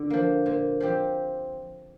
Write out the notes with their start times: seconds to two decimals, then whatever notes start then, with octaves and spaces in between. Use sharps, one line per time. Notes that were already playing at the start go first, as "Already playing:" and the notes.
Already playing: D3
0.10 F3 A#3
0.46 A#2
0.80 F3 C4 G4